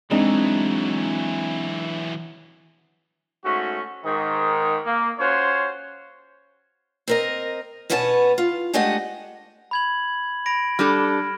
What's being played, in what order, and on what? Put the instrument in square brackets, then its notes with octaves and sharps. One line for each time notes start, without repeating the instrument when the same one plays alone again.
[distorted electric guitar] E3 F#3 [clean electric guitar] G#3 D4 D#4 [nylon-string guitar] C4
[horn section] G#2 A3 C#4 F#4
G#2 D#3
A#3
C#4 F4 F#4 C5 C#5
[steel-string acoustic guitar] C4 A#4 D#5
B2 B3 C#4 C#5 D5 A5
F4
G#3 A3 D4 G4 D#5 F#5
[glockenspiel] B5 G#6 F#7
B5 A#6 D7
[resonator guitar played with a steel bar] G3 D4 A4 [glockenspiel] B5 F6 A#6